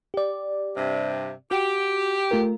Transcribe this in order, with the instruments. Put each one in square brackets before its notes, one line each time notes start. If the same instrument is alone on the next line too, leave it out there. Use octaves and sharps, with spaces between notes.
[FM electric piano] G4 D5
[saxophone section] G2 C3
[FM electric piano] F#4 [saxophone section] G4
[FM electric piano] A3 F4 A#4